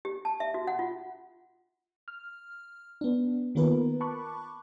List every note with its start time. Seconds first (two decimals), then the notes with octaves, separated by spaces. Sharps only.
0.05 G4
0.25 A5
0.40 E5
0.54 F#4
0.67 F#5
0.79 F4
2.08 F6
3.01 B3 D4
3.55 D#3 A#3 B3 F4 A#4 B4
4.01 A5 B5 C#6 D6 F#6